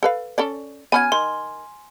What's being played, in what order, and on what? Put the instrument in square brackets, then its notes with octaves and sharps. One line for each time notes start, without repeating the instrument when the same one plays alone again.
[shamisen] A4 B4 F5
C#4 A4 D5
[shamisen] B3 C#4 F#4 [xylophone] G#5 F6 G#6
[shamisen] D#3 [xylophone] C6